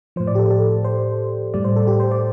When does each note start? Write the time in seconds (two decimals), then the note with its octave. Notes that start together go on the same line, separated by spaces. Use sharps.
0.16 A2 F3 C5
0.27 D5
0.35 G4
0.39 A4
0.51 A4
0.85 C5
1.54 A2 G3 D5
1.65 C5
1.76 A4
1.87 G4
2.00 C5
2.11 D5